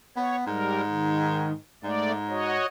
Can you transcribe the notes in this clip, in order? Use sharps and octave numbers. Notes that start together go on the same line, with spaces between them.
B3 C#5
G#2 G3 A#4
D#3
G#2 A3 D5
F#4 C#5 D#5